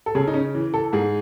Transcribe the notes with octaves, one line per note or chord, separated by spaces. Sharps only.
A4
C#3 G#4
D#4
C#4
E3
A4
G#2 G#4